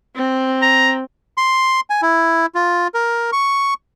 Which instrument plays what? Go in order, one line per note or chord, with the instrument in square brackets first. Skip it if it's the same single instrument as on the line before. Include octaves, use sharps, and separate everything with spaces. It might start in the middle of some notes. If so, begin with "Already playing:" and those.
[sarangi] C4
[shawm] A#5
[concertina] C6
G#5
E4
F4
A#4
C#6